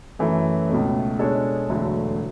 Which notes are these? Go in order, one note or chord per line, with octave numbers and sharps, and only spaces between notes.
F#2 E3 A3
C#2 B2 A3
B2 G#3 D4 A4 C#5
E1 D2 D3 F#3